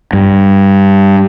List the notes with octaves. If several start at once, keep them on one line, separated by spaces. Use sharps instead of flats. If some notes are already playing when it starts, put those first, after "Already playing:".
G2